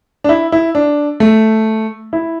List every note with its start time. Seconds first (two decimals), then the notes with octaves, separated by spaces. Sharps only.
0.24 D4
0.29 E4
0.52 E4
0.75 D4
1.20 A3
2.13 E4